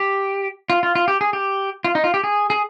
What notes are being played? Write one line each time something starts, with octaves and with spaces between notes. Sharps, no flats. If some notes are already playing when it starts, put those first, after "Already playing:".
Already playing: G4
F4
F4
F4
G4
G#4
G4
F4
D#4
F4
G4
G#4
G#4